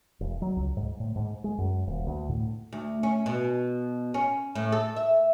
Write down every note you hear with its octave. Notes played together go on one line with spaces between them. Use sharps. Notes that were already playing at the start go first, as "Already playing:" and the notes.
E1
F#3
C#2
G#2
A2
G#2
G#3
F#2
D#1
D2
A2
D2
C#4
B2
C#4
A2
A4
E5